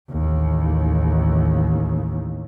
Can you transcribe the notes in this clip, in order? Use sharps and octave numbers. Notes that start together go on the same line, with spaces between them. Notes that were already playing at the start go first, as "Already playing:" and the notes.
A1 D#2